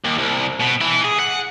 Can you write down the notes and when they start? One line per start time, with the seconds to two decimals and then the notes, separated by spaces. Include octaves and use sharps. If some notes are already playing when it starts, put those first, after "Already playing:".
0.04 D#2
0.18 C2
0.60 B2
0.81 E3 E4
1.04 G#4
1.19 F#5